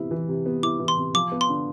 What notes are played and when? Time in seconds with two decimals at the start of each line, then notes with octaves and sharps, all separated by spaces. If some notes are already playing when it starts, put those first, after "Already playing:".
Already playing: C3 E3 B3 E4
0.11 E3
0.29 C3
0.46 B3
0.63 E4 D6
0.79 E3
0.88 C6
0.98 C3
1.14 F3 D6
1.32 B3
1.41 C6
1.49 D3